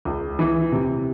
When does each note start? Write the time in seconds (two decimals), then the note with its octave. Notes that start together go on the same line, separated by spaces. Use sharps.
0.05 C#2
0.39 E3
0.72 C3